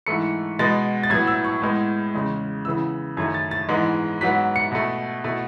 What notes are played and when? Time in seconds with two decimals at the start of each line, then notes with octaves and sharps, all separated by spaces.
0.07 G#2 E3 A3 C#7
0.59 B2 G#3 B3 A6
1.03 A6
1.10 A2 F#3 B3 G#6
1.27 E6
1.44 C#6
1.62 A2 G#3 B3
2.14 E2 C#3 G#3
2.65 C#3 E3 B3 E6
3.17 F#2 D#3 A3 G#6
3.34 A6
3.51 A6
3.69 G#2 E3 G#3 B3
4.21 G#2 F#3 B3 B6
4.56 C#7
4.72 B2 A3
5.24 B2 A3